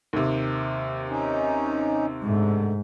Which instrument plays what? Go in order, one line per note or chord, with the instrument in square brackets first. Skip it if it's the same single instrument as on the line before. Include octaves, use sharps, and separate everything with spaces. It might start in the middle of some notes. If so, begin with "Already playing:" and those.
[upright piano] D#2 C3
[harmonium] C#4 D#4
[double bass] G#2 [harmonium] D3 A3